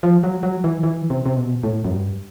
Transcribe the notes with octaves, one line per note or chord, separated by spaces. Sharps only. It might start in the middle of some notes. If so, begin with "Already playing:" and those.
F3
F#3
F#3
E3
E3
C3
C3
B2
A2
F#2
G2